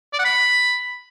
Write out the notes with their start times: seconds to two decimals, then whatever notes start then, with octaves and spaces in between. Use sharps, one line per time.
0.13 D5
0.19 F#5
0.25 B5